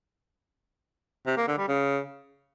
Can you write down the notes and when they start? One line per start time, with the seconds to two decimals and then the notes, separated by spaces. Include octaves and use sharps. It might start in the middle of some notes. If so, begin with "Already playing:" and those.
1.27 C3
1.37 A#3
1.47 D3
1.58 G3
1.68 C#3